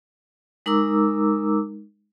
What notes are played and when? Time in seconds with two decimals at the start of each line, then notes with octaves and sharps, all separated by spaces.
0.66 G#3 D#4 A#4 A#5 D6 E6